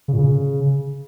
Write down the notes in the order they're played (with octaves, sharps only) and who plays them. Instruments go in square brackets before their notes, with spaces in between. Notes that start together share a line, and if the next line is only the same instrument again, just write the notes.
[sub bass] C#3
A#2
C#3